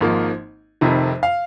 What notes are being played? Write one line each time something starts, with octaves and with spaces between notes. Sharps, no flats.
G#1 G#2 F3 A#3
F1 F2 C3 D#3
F5